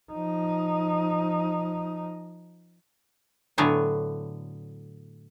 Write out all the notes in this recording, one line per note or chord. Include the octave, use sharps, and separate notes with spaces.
F3 D#4
A2 D3 F#3 B3 G#5